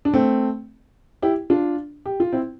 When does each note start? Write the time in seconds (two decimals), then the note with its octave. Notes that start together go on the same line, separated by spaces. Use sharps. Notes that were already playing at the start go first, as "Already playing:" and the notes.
0.05 D4
0.13 A3 C4
1.22 E4 G4
1.50 D4 F4
2.06 G4
2.20 F4
2.32 C4 E4